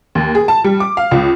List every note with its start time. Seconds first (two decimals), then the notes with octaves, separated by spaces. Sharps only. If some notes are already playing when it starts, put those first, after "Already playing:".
0.15 D#2
0.35 G#4
0.48 A5
0.64 G3
0.80 D6
0.97 F5
1.11 C#2